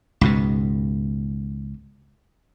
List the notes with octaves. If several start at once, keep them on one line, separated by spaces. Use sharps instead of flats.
C#2 G#2 B2